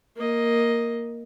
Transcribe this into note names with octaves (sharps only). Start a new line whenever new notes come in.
A#3 D#5